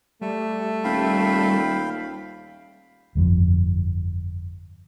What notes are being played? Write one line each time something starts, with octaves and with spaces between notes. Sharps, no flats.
G3 A3
D#1 F5 G5 B5
G1 F2 F3